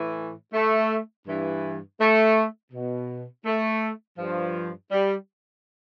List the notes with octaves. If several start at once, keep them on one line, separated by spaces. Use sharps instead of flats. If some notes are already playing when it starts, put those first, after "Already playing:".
Already playing: A2 E3
A3
G2 E3
A3
B2
A3
G2 F3
G3